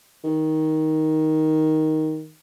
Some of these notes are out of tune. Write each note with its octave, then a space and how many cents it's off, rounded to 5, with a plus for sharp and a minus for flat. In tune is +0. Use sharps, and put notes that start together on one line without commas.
D#3 +10